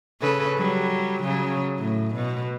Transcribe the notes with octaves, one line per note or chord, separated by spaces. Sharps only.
C#3 A4 B4
F#3 G3
C#3 F#3
A2
B2